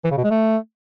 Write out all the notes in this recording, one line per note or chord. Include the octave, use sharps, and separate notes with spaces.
E3
C#3
B2
G#3
A3